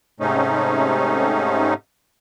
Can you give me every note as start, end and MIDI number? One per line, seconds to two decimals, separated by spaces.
0.20 1.74 44
0.20 1.74 48
0.20 1.74 57
0.20 1.74 61
0.20 1.74 63